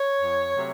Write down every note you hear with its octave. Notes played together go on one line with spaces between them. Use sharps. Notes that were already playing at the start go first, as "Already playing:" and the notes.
Already playing: C#5
F2
C3 F#3 A3